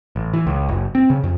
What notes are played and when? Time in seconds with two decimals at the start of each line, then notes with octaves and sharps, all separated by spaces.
0.16 A1
0.34 E3
0.47 C#2
0.69 F#1
0.95 C4
1.10 C#3
1.24 F2